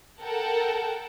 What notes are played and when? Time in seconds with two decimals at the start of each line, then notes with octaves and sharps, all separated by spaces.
0.22 A4 A#4 F#5 G5 A5